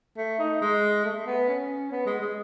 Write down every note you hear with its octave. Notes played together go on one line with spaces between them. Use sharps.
A3
D#4
G#3
A3
A3
B3
C#4
B3
G#3
G#3